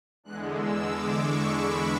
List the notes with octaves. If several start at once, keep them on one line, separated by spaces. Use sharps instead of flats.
E2 D3 G#3 F#6
E6
D6
C#6
B5